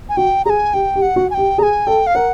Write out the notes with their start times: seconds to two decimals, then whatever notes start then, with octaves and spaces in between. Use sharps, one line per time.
0.09 G#5
0.17 F#4 G5
0.45 G#4 A#5
0.50 G#5
0.73 G4 G5
0.95 G4
1.02 F#5
1.16 F#4
1.30 G#5
1.34 G4 G5
1.58 G#4 A#5
1.63 G#5
1.87 A4 G5
2.07 F5
2.15 A#4 F#5